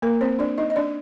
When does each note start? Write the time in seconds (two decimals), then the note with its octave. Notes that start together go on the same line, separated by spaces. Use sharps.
0.02 A#3 A#4
0.21 C4 C5
0.39 D4 D5
0.58 D#4 D#5
0.70 D#5
0.76 D4 D5